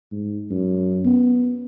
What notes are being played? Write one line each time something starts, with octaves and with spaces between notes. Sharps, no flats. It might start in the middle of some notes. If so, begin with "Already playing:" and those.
G#2
F#2
B3